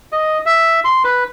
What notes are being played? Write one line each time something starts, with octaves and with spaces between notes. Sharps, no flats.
D#5
E5
C6
B4